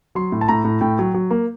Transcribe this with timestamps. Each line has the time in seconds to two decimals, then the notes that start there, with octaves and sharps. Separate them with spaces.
0.15 F#3 C6
0.32 A2
0.41 A5
0.48 A2 A#5
0.64 A2
0.81 A2 G5
0.99 F#3
1.14 F#3
1.31 A#3